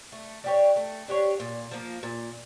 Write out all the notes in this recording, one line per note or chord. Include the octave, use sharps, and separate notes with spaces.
A3
D4 G4 C#5
A3
D4 G4 C#5
A#2
F3 A#3
A#2